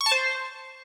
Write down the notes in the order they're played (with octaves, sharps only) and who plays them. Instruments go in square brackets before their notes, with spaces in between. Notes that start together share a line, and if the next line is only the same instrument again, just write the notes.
[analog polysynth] C#6
A5
C5